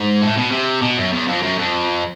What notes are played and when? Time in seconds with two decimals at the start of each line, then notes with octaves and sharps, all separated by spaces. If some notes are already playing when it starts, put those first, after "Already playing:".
Already playing: G#2
0.22 A2
0.37 B2
0.51 C3
0.82 B2
0.97 F#2
1.13 E2
1.28 F2
1.42 F#2
1.58 F2